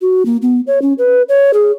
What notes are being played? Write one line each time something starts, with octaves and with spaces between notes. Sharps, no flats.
F#4
A#3
B3
C#5
C#4
B4
C#5
G#4